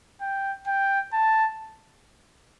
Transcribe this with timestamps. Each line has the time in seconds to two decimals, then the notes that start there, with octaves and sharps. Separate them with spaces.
0.21 G5
0.67 G5
1.13 A5